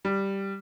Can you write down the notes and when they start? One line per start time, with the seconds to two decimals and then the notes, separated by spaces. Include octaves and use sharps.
0.05 G3